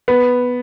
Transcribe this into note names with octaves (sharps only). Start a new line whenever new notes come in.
B3